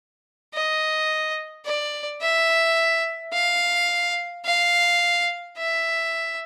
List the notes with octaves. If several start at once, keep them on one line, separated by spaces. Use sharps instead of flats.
D#5
D5
E5
F5
F5
E5